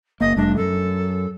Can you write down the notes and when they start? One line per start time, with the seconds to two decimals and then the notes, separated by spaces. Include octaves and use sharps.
0.21 F#1 A#3 D#5
0.37 F1 G3 A3 D4
0.57 F#2 A4